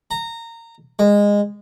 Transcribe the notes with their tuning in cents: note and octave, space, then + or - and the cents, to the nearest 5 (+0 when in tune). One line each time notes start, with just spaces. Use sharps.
A#5 -20
G#3 -20